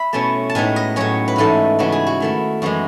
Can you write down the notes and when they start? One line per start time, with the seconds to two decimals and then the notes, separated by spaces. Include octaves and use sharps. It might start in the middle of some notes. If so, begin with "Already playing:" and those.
Already playing: E5 B5
0.13 B2 A3 C#4 E4 A5
0.50 A5
0.55 A2 G#3 B3 D#4 G#5
0.76 D#5
0.96 A2 F#3 C#4 C#5
1.28 B4
1.36 G#2 E3 A3 D#4 A4
1.79 C#3 E3 B3 E4 F#4
1.92 G#4
2.07 F#4
2.20 D#3 A3 E4
2.62 F#2 E3 G#3 F#4